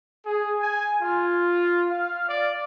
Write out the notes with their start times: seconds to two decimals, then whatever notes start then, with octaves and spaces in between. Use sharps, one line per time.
0.25 G#4
0.60 G#5
1.00 F4
1.89 F5
2.28 D5